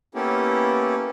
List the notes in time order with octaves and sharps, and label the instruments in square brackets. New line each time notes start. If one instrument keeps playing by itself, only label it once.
[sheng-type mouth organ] A#3 B3 C#4 E4 G4 A4